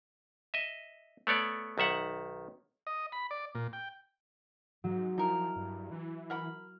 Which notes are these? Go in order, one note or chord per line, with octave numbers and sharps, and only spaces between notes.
D#5 E5
A3 B3 C#5 D5
B1 D#3 E5 F#5
D#5
B5
D5
A#2
G5
G#2 F#3
F3 D#4 E4 A#4
G2
E3
A#4 F#5 B5 F6